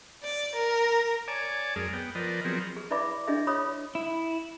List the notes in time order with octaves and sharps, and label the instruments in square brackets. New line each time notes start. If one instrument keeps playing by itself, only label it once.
[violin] D5
A#4
[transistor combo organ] C#5 D5 G#5 A5 D6
F#2 G#3 G#4 A#4
B3 G5
F3 A#4 B4 D5 D#5
F3 F#3 B3 C4 G#4 A#4
[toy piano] G#4
E4 B4 D5 E5 B5 D6
D4 E4 G#4 D#5 E5
F4 C#5 B5 D#6
[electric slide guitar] E4